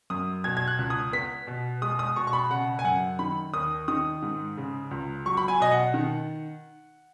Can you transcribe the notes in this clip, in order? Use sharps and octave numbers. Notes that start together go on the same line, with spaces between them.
F#2 D#6
B2 G#6
G#6
F#6
C#2
D#6
B3 B6
B2
G#3 D#6
D#6
B2 C#6
C#6
B5
C#3 F#5
G#5
F#2 F#5
D#3 B5
D#2 D#6
D#3 D#6
G#2
C#3
C#2
F#3 C#6
B5
G#5
B2 D#5
F#5
D#3